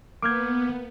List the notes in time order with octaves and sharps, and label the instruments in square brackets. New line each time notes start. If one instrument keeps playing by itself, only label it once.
[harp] A#3 G6 [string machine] B3 [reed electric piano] D6 F6 G#6